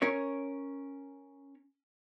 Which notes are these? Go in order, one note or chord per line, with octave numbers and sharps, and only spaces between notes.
C#4 A#4 C#5